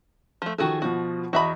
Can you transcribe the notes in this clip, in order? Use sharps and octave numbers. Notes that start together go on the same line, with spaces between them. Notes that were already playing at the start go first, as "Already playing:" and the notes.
F3 A3
D#3 F3 F#4 G#4 A4
B2 F3 F#4
E2 F#4 D#5 E5 B5